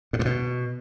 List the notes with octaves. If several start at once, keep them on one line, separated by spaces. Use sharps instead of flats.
A2
G2
B2